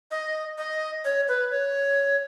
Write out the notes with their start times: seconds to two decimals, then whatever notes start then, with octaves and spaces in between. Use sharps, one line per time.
0.11 D#5
0.58 D#5
1.04 C#5
1.28 B4
1.51 C#5